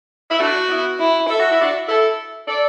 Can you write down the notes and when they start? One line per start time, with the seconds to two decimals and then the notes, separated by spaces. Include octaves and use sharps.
0.31 E4
0.39 A3 D4 F#4
0.69 B3 E4
0.99 E4
1.29 A4 E5
1.39 F#4
1.50 E4
1.61 D4 F#4
1.88 E4 A4
2.47 A4 D5